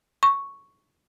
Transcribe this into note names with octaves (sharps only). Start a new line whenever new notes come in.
C#6